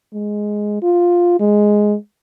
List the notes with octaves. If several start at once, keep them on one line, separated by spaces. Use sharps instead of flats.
G#3
F4
G#3